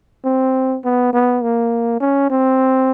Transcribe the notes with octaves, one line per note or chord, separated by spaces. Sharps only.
C4
B3
B3
A#3
C#4
C4